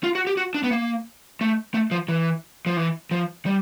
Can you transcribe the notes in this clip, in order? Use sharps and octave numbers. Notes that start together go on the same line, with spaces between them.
F4
F#4
G4
F#4
D4
B3
A#3
A3
A3
F3
E3
F3
E3
F3
G3